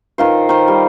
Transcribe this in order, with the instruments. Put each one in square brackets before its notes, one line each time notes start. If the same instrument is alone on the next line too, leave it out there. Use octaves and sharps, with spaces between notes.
[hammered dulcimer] D#3 F4 C5
D#3 C5
G3